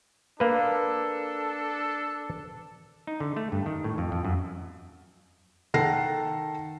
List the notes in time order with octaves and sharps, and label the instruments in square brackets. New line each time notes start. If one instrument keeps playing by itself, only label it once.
[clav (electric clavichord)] A#3 B4 [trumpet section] D4 A4
[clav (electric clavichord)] D#4
D3
A3
G2
D#3
A2
F2
F2
F#2
[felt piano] D#3 A4 F#5 A5 A#6 C7